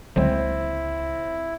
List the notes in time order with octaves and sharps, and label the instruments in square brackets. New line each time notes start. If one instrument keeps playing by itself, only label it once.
[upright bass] C#2 A#3 [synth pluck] D3 F#3 G#3 [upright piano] C4 [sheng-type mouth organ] E4